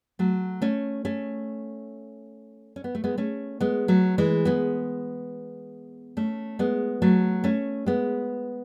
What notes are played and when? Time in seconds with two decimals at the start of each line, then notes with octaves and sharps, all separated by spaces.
0.19 F#3 A3
0.62 A3 C#4
1.05 A3 C#4
2.76 C#4
2.84 B3
2.95 A3
3.04 G#3 B3
3.18 A3 C#4
3.61 G#3 B3
3.88 F#3 A3
4.18 E3 G#3
4.45 G#3 B3
6.17 A3 C#4
6.59 G#3 B3
7.02 F#3 A3
7.44 A3 C#4
7.86 G#3 B3